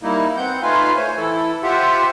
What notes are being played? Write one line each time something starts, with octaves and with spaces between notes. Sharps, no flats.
G3 A#3 D#4 E4
B3 C4 F#5 G6
A3 D#4 F4 B4 F5 G#5
A3 C5 C#5 G#5
E3 E4 A4
F4 G4 C5 E5 F#5